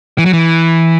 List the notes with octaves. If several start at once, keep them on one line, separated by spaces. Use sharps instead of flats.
E3
F#3
E3